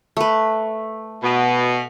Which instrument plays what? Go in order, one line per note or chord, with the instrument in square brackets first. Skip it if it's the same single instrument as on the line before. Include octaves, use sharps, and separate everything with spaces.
[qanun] A3 B4
[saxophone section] B2